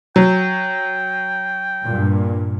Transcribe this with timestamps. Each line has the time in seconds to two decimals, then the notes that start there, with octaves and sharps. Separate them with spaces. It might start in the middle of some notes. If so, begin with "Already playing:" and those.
0.16 F#3 G5
1.84 G2 A#2